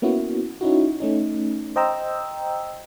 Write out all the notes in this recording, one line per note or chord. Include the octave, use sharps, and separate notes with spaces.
A#3 B3 C#4 E4 F#4
C#4 D#4 E4 F#4
A3 C#4 D#4
C5 D#5 G5 A#5 E6